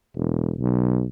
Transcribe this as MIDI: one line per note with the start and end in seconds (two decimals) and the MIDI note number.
0.16 0.52 28
0.59 1.05 35